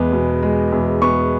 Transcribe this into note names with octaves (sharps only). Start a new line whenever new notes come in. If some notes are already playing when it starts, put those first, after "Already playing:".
Already playing: E2 G#3 B3
B2
G#3
E2
B3 C#6